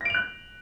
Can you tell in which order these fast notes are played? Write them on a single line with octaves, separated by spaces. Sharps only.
A#6 D7 F7 F#6